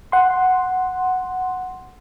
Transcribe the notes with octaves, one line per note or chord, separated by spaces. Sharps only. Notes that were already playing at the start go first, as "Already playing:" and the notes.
F#5 C6